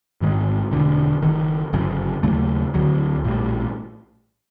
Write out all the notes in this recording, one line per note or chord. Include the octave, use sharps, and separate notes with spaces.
A1 G#2 D#3 G#3
E1 D2 D3
F#1 F#2 D#3
G1 F#2 C#3
D#2 C#3 F#3 A3
D2 D3 F#3
A#1 A2 E3 G3